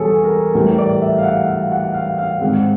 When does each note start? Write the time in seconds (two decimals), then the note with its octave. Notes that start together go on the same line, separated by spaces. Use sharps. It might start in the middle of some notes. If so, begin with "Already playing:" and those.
Already playing: E2 B2 G3 G#4 A4 C#5
0.24 A#4
0.54 A2 E3 G3 A#4
0.78 D5
1.02 E5
1.18 F5
1.24 F#5
1.48 F5
1.72 F#5
1.94 F5
2.18 F5
2.41 G#2 D#3 G#3 C4 F#5